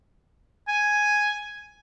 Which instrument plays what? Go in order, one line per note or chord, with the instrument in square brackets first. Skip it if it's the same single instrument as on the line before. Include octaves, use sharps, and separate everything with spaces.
[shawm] G#5